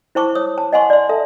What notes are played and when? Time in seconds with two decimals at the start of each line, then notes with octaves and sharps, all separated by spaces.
0.15 E4 C5 A5 C#6 D6
0.35 C#5 D#6
0.58 A5
0.73 D#5 F#5 G#5 C6 C#6
0.90 D5 C6
1.09 A4 E5 A5